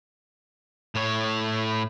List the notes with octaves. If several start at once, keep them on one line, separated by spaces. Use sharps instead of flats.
A2 C#5